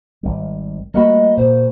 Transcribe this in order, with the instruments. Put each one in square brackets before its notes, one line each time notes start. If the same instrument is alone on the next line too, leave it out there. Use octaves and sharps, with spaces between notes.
[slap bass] G#1 G3
[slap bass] G3 A3 [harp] A#3 F#4 B5 [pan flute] D#5
[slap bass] A#2 [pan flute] C5